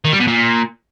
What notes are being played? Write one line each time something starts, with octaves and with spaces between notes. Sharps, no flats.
D#3
G3
B2
A#2